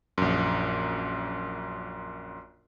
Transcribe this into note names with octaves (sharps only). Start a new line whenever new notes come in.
A#1 F#2